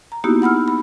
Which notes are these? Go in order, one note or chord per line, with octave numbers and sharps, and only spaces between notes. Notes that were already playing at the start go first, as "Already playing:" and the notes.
A#5
A#3 B3 D#4 E4 F#4 G4
F#5 B5 E6 F6
B5